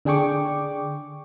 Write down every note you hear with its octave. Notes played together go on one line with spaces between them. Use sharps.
D3 D4 G#4 G5 C#6 D6